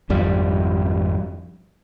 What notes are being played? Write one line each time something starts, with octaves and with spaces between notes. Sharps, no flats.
G#1 F2 G3